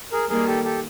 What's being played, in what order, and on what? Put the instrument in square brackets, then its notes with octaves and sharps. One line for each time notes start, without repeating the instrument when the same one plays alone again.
[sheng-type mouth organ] G#4 A#4
[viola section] D#3 G3 A#3 [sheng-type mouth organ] G#4 A#4
[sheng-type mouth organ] G4 A4
G4 A4